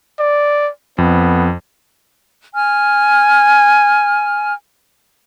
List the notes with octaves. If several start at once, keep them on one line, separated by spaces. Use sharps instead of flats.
D5
F2 B3
G#5 F6